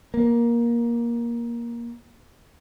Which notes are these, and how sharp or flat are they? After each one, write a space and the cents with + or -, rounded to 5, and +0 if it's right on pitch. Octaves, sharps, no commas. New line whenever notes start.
A#3 +15